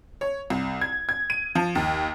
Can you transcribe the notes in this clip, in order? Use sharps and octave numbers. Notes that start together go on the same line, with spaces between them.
C#5
C2
G#6
G#6
D#7
F3
D#2